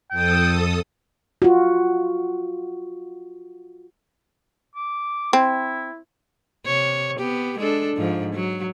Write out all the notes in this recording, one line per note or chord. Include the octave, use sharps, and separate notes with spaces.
F2 A4 G5 D#6
F4 F#4
D6
C4 E4
C3 C#5
B3 G4
G#3 D4 A4
G#2 F3
F#3